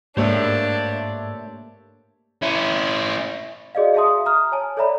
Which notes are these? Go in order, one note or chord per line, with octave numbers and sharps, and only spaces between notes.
G#2 A3 A#3 D4 G4 C5 C#5 E5
C#4 E4
F#4 G#4 D5 D#5 F5
G#4 E5 F5 A5 C6 D#6
A#5 D#6 F6
C#5 G#5 A5
A4 C#5 D5 E5 A#5 B5